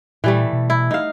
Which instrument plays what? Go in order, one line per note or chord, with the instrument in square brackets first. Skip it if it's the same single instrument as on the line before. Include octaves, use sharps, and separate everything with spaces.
[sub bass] A#2 [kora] E3 G3 A3
[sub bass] B2
[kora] E4
D#4 F5